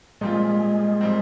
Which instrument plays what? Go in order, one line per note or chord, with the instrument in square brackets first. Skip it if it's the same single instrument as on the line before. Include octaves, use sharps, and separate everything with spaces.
[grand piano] A#2 G3 C4 F4 [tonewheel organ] G#3
[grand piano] A#2 G3 C4